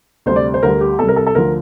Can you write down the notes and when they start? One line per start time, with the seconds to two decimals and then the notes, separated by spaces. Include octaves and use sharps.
0.26 D2 C3 G3 C5
0.36 D5
0.54 C5
0.63 D2 D3 G3 A#4
0.81 G4
0.99 C2 C3 G3 A4
1.08 A#4
1.16 A4
1.27 A4
1.35 D2 D3 F3 A#4